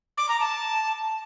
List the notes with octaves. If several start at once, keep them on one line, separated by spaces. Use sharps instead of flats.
D6
A#5
A5